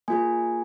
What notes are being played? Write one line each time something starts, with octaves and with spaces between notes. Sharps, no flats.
A#3 F4 G#4 G#5